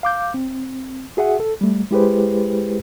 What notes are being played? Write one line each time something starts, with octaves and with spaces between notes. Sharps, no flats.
F5 D6 G6
C4
F#4 G#4 E5 F#5
A4
G3 A3
G#3 E4 G4 G#4 B4 C5